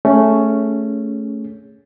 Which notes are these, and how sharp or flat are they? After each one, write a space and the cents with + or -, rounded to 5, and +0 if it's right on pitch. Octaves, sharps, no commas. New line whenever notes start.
A3 +0 C#4 +0 G#4 -10